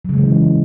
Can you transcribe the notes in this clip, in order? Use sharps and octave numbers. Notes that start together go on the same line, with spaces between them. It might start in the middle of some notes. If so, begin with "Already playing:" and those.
C#3 E3 F#3 G#3